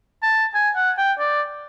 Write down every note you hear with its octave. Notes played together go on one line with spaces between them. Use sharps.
A5
G#5
F#5
G5
D5